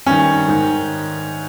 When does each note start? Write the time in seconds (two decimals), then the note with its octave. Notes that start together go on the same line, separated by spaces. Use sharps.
0.06 G2 D#3 C#4
0.48 G#2 D#3